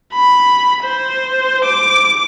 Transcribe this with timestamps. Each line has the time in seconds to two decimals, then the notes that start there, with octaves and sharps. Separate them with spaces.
0.14 B5
0.84 C5
1.65 D6